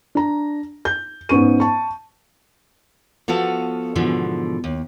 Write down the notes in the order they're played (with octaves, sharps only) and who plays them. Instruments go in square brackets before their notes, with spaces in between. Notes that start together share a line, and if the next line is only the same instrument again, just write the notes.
[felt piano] D4 A#5
G6
G#2 B3 C#4 C#6 D#7
A5 C#6
[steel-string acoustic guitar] F3 B3 F#4 A4 F5
G#2 B2 D3 E3 F3
D#2